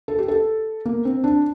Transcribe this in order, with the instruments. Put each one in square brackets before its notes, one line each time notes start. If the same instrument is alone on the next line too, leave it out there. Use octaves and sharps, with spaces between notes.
[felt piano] A4
G4
A4
A#3
C4
D4